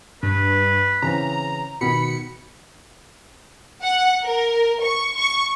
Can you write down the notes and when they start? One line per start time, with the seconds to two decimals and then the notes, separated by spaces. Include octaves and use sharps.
0.23 G2 B4
1.02 C#3 E3 C4 A#5
1.81 B2 D#3 B5 C#7
3.82 F#5
4.24 A#4
4.82 C#6
5.16 C#6